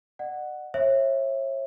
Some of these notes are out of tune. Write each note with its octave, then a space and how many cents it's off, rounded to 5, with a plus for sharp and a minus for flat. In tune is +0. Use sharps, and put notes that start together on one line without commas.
D5 +45 F#5 +0
C#5 -40 E5 +0